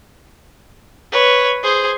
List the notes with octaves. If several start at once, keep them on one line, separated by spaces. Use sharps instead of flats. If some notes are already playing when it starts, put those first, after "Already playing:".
B4 C#5
G#4 C5